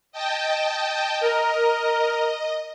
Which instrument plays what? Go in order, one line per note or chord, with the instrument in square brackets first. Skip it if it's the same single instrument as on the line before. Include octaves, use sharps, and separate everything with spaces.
[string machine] D#5 G5 A5
[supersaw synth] A#4 [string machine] D#5